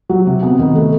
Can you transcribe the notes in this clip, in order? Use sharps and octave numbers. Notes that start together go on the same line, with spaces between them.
F#3
C3
B3
D#3
A3